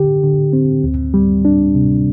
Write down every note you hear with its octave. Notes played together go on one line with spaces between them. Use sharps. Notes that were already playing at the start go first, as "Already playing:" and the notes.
Already playing: D3 G4
D3
C4
D2
G3
D4
C3